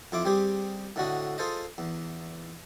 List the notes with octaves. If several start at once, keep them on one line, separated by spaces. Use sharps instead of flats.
F2 E4 F4 D6
G3 C4 G4 G#4
A2 D3 F#4 D#5
F4 G#4 A4 C5 D#5
E2